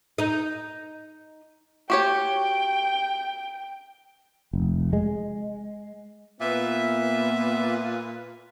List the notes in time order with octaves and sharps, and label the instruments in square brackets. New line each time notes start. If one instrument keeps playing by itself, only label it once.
[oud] D#4 D#5
[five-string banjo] F#4 G4 C#5 [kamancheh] G5
[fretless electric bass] F1
G#3
[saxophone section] A#2 B4 [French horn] B3 [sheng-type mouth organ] E5